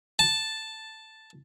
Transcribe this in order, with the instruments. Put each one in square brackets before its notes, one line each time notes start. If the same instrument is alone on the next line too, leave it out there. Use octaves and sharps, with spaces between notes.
[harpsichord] A5